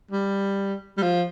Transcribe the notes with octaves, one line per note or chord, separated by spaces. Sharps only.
G3
G3
F3